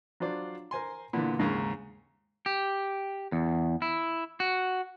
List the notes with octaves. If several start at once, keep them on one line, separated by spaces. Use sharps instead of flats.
F#3 D4 F4 C5 D5
A#4 C5 G#5 C6
A#2 D3 E3 B3
D#2 G#2 C#3 A#4 A#5
G4
E2
E4
F#4